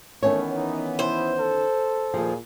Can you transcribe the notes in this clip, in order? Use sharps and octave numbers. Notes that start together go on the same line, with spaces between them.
D#3 E3 A3 B3 C#4 C#5
D#4
E4 C5
A4
D#2 A#2 F3 G#4